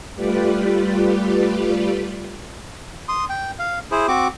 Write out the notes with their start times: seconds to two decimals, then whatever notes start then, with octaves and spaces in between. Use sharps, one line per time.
0.16 G3 A3 F4 G4 B4 D5
3.09 C6 D#6
3.29 G5
3.59 F5
3.91 E4 G#4 C5
4.08 C4 F#4 D6